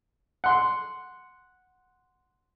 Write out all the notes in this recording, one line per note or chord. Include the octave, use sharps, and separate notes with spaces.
F#5 C6